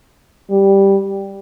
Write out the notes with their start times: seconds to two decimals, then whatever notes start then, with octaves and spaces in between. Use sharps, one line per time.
0.51 G3